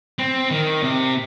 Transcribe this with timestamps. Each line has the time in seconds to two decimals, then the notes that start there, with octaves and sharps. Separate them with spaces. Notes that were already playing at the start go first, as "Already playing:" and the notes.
0.19 C4
0.51 D#3
0.83 C3